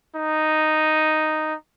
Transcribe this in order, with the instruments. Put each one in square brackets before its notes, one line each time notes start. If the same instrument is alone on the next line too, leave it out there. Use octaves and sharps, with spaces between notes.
[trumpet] D#4